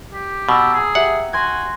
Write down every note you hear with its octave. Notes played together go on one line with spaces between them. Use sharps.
G4
B2 A#5 E6 A6
G#4
G4 E5 F#5
F#4 G#5 C6 G#6